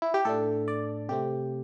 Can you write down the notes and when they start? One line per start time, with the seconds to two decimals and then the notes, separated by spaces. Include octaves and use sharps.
0.02 E4
0.14 G4
0.25 A2 A3 D4 A4
0.68 D5
1.09 C3 A3 C4 G4